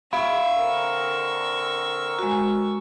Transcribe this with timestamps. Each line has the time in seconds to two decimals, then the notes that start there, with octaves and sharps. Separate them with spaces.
0.13 E5 F5 B5 C#6 E6
0.56 D3 C4 A#4
2.19 G#3 F#4